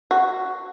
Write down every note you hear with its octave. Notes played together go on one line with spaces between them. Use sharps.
F#4